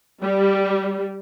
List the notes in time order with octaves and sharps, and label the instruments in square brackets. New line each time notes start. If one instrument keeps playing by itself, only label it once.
[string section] G3